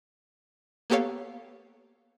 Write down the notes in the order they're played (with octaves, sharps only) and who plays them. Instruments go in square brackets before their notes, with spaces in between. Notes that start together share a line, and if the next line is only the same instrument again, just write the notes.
[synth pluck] A#3 B3 G4 A4 C#5 F5